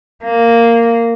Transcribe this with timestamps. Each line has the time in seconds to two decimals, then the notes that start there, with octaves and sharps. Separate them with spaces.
0.25 A#3